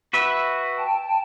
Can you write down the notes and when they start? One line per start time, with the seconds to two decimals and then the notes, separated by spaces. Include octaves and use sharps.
0.13 F#4 B4 E5
0.78 G5 A5